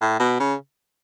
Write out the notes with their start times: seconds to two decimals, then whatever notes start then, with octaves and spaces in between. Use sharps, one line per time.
0.02 A2
0.20 B2
0.40 C#3